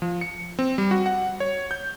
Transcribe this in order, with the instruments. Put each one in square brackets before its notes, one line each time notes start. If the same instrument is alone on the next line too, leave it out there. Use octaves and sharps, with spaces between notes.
[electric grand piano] F3
C#7
C4
G3
F#4
F#5
C#5
G6